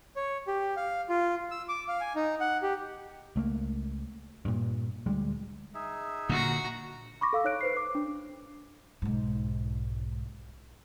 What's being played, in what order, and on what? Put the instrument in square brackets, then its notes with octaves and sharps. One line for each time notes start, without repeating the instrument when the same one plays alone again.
[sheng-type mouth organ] C#5
G4
F5
F4
E6
D6
F5
G#5
D#4
F#5
G4
[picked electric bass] C#2 A3 A#3
G2 A#2
D2 G3 G#3
[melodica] D#4 G#4 E5
[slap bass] A#2 D3 [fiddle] F#4 A#5
[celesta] B5 C#6 D6 A#6
A4 F5 E6
D#4 C#5 F#6 D7
B4 C5 C7
D6
D4
[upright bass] B1 G#2